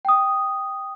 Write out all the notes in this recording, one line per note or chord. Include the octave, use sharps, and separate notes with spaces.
G5 D#6